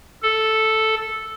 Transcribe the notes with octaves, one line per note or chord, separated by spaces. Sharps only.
A4